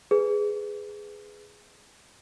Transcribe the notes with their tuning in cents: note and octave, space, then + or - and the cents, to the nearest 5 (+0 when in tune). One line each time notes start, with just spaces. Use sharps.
G#4 +0 B4 +15